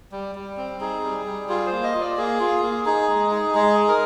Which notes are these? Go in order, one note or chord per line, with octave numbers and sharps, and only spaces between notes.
G3
G3
C4
D#4 G#4
G3
G3
F4 G#4
C5
A#3
D#5
F4
D5
A#3 G#4
F4
A#3
D#4 G#4
G#3
D#4
G#3 G#4
D#4
A#4